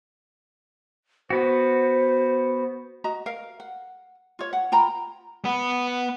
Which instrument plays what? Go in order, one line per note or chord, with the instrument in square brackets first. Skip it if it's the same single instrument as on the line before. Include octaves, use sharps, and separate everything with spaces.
[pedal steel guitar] B3 F#4 [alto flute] C5
[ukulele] F#4 D#5 A#5
A#4 F5
F#5
F4 C#5
F#5
F4 G5 A#5 B5
[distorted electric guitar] B3